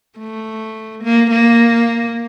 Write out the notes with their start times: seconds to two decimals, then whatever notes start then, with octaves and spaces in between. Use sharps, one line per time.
0.19 A3
1.04 A#3
1.31 A#3